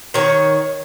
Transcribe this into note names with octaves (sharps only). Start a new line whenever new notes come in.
D#3 C#5